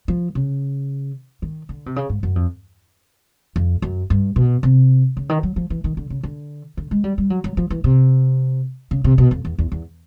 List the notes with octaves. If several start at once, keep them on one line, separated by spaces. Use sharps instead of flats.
F3
C#3
D#3
D3
C3
C#3
G#2
F#2
F2
F2
F#2
G2
B2
C3
C#3
D#3
F#3
F3
E3
D#3
D3
C#3
D3
D3
G#3
G3
G3
F#3
F#3
F3
E3
C3
C#3
C3
B2
F2
E2
E2
E2